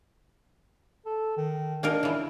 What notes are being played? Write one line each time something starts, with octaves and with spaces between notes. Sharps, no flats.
A4
D#3
A#3 D4 D#4 A#4
C#3 E3